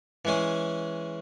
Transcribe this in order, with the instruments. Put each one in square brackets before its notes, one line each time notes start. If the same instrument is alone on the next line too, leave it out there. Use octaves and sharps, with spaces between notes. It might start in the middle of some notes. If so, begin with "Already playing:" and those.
[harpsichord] E3 G#3 C#4 G#4